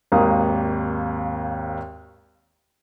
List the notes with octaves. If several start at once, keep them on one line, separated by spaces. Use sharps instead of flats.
G#1 D#2 A#4 F5 A#5 D#6